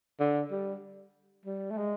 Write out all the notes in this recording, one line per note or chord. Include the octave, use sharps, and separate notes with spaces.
D3
G3
G3
A3
G#3